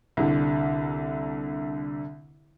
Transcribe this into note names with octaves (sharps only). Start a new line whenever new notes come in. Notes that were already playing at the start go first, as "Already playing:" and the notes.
C2 D3